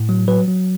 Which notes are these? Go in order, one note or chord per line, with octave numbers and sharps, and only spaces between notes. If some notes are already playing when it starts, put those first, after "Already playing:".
Already playing: A2
F#3
F#3 B4
F#3